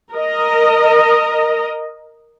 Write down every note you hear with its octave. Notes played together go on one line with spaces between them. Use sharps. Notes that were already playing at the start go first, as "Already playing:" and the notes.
A#4 D#5